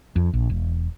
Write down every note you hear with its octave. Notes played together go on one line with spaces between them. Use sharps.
F2
A#1
E1